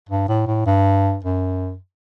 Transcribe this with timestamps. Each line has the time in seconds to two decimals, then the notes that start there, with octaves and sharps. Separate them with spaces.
0.09 G2
0.28 A2
0.47 A2
0.66 G2
1.25 F#2